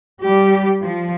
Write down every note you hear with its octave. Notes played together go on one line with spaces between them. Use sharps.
G3 G4
F3